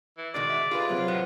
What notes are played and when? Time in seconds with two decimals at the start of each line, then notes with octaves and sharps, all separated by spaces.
0.18 E3
0.34 B2 D#3 G#3 D5
0.49 E5
0.71 F4 G4 G#4 B4
0.89 C3 F#3
1.08 E2 A2 B3